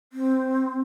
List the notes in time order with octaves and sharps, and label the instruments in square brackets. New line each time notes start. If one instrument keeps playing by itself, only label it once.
[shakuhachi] C4